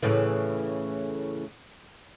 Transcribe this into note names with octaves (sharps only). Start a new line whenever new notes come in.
A2 C#3 E3